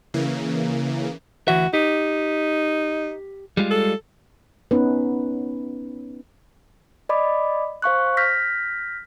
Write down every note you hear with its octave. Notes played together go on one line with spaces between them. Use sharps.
C#3 E3 A#3
D2 E3 F#4 E5
D#4 G4
G3 G#3 F4
A4
B3 C#4 D#4 B4
D5 D#5 B5 D6
C5 F5 C#6 F#6
F6 G6 A#6 B6